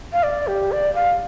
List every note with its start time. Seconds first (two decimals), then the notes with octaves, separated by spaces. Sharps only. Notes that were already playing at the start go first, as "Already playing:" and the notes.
0.13 F5
0.23 D5
0.47 G4
0.72 D5
0.95 F5